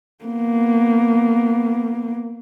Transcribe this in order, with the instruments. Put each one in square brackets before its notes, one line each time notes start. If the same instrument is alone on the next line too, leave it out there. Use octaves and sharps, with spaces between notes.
[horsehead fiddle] A#3 B3